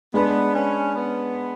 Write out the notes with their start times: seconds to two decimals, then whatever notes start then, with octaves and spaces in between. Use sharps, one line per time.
0.14 G#3 B3 D4 G#4 B4
0.54 C#4
0.95 B3